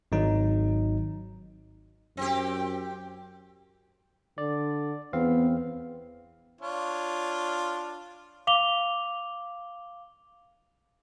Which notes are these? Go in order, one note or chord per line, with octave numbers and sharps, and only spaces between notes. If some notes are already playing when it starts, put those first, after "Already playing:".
G#1 F#3 D#4
F#2 C4 G4
D3 D5
E2 B3 C4 F5
D4 F4 C#5
F5 D6 F7 G7